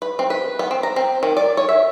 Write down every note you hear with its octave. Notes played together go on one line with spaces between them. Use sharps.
B4
C4
B4
B3
C4
A#5
C4
D#3
D5
C#5
E5